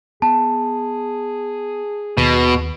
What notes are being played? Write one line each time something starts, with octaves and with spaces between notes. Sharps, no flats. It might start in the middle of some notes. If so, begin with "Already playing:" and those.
B3 G#4 A5
D#2 B2 D#3